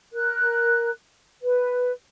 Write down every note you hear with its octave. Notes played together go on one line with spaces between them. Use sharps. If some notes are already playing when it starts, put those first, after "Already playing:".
A#4 F#6
B4